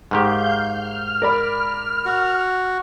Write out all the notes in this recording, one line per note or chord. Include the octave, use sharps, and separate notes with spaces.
G#2 D#3 G4 F5 G6
F6
A#4 D5 B5
F#4